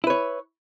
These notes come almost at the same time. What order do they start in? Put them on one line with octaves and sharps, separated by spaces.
E4 B4 C#5